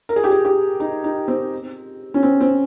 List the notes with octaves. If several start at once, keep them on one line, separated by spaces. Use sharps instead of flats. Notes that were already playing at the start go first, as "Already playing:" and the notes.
A#4
G#4
G4
G#4
G4
D#4
D#4
C4
C#4
C4
C4